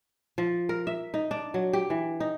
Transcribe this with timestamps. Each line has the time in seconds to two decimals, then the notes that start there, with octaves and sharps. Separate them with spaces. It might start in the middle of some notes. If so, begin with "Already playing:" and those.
0.38 F3
0.69 A#4
0.87 E5
1.14 D#4
1.31 D4
1.54 F#3
1.73 G4
1.90 E3
2.20 D#4